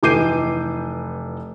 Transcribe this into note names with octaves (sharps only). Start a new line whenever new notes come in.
F1 E3 D6 G6 C7 D#7